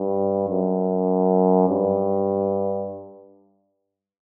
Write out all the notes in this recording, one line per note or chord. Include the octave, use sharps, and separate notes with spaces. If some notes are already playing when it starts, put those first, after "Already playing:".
Already playing: G2
F#2
G2